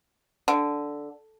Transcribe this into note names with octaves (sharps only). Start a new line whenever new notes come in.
D3